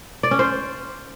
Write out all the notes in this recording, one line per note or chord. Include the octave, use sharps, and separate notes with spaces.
D5
C#4
C5